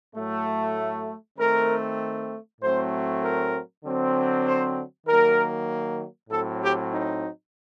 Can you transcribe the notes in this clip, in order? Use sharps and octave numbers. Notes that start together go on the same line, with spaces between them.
A2 F#3 A3
D#3 A3 C4 A#4
A2 F#3 A3 C4 C5
A#4
D3 F#3 C4
C5
D#3 F#3 A#3 A#4
A2 F#3 C4 A4
G4
D#4